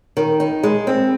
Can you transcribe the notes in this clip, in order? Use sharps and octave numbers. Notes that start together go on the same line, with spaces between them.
D#3
D#4
G#3
C4